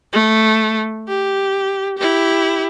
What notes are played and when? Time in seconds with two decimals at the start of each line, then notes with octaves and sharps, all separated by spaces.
0.13 A3
1.08 G4
1.98 E4 G4